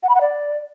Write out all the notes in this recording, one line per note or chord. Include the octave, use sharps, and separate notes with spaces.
F#5
B5
F#5
D5